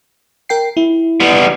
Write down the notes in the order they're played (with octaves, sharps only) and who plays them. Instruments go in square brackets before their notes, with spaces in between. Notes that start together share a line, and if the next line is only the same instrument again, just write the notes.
[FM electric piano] A#4 G5 C7
E4
[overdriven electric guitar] G3 B3